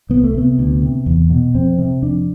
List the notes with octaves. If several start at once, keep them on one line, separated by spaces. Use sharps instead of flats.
C2 B3
A3
C3 B3
D2
C3
E2
B2
F2 C4
C3
F2 D4